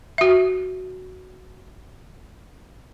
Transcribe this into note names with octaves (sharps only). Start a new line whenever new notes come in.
F#4 E5